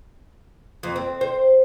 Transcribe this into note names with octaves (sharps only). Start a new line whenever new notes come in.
F2
C4
C5